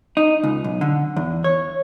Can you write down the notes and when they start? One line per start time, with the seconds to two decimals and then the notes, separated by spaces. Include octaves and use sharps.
0.17 D#4
0.43 C#2
0.64 B1
0.81 D3
1.16 E2
1.44 C#5